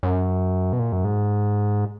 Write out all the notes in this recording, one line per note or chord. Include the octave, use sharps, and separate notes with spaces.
F#2
B2
A#2
F#2
G#2